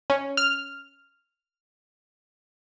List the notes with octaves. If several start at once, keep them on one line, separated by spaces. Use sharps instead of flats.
C#4
F6